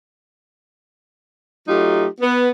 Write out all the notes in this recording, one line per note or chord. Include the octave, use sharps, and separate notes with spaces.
F#3 A3 D#4 F4 G4
B3